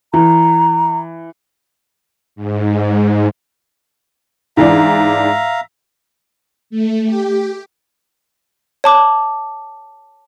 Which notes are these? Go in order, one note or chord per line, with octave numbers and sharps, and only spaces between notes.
E3 A#5
G#2
G#2 E3 D4 E5 F5 A#5
A3
G4
C#5 A5 D6